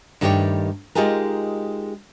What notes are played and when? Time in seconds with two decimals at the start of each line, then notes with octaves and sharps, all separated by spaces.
0.21 G2 D#3 A3 G4 G#4 C#5
0.95 G#3 D#4 F4 G4 G#4 A#4